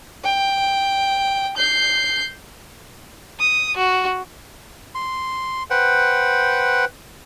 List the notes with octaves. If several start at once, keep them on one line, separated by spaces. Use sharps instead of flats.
G5
G6 C7
D#6
F#4
C6
B4 C5 F#5 G5